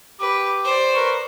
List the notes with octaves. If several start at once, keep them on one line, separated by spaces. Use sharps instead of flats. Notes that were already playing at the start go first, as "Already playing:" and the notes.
G4 B4 D6
C5 D5
A#4 B4 C#6